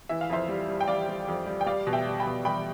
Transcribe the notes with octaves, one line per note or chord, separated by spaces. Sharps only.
E3 E5
F5
F2 C5 E5
G3
G3
G5
G3 D5 F5
G3
F2
G3
G5
G3 D5 F5
B2
E5 G5
G3
G5 B5
B2
G3 G5 B5